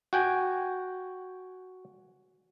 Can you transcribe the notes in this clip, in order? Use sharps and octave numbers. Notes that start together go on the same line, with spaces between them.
F#4 G5 G#5